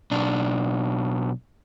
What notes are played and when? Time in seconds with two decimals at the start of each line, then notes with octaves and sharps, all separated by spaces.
0.11 B1 D4